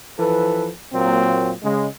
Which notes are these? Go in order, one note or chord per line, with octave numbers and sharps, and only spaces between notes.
E3 F3 A4 B4
A#2 F#3 A#3 C4
C#3 G#3